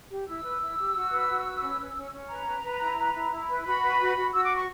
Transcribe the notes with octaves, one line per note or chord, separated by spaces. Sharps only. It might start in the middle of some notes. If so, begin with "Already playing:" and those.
G4
E4 E6
B4
E4
G4
F#4
B4
F#4
B4
C#4
C#4
C#4
C#4
B4 A#5
B4
B4
E4
B4
E4
E4
B4
F#4 B5
B4
F#4
F#4
F#4 E6
D6
B4
C#6